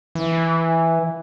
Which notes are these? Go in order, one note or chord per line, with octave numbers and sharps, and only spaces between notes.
E3